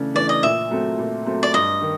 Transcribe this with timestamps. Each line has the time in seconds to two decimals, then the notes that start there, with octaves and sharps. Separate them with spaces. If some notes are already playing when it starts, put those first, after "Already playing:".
Already playing: C#3 E3 A3 D4
0.15 E3 A3 D4 D5
0.29 D#5
0.43 A#2 E5
0.70 F#3 A3 C4
0.99 A#2
1.26 F#3 A3 C4
1.43 D5
1.54 G2 D#5
1.82 D#3